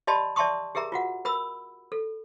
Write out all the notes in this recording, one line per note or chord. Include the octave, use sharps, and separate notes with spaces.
G4 D5 D#5 A5 B5 C6
D5 E5 A5 C6 C#6 D#6
G4 G#4 A#4 E5 A#5
F4 F#4 F#5
A#4 B5 E6
A4